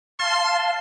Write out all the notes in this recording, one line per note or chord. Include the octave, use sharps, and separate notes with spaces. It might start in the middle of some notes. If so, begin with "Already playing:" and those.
F5 A5 C6